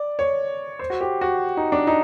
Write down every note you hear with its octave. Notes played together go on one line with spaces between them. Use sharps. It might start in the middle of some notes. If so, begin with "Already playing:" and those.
Already playing: D5
C#5
C5
F#4
G4
F#4
D#4
D4
D#4